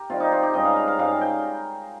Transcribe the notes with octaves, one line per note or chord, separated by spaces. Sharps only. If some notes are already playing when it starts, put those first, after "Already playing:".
Already playing: G4 A#4
C3 D#3 G3 F4
D#4
F4
G4
G#2 G3 C#4 D#5
F5
F5
F5
G#2 G3 C#4 F5
G5